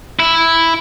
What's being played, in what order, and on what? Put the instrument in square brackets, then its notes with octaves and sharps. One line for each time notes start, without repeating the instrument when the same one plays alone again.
[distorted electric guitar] E4